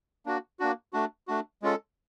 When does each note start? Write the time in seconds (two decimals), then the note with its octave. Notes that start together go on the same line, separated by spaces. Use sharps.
0.26 A#3 D4 F#4
0.60 A#3 D4 F#4
0.93 A3 D4 F#4
1.28 A3 D4 F#4
1.62 G#3 C#4 F4 A4